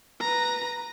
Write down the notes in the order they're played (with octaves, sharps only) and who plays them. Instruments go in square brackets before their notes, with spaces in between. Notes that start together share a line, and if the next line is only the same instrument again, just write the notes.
[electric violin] B4 A#5